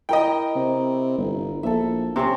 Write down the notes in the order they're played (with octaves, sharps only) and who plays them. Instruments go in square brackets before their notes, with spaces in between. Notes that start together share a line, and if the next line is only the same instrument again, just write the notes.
[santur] E4 A#4 D#6 [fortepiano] D#5 G5
[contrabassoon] C3
G1
[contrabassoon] A#1 [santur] A4 E5
[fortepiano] C3 [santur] C4 C#4